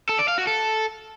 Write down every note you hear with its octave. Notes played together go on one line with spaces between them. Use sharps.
A4
D5
F5
F#4
A4